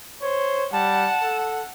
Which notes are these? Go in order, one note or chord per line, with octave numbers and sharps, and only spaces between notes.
C5 C#5
G3 F#5 A5
A4